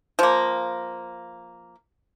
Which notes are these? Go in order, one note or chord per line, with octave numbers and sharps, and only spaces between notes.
F3 A#3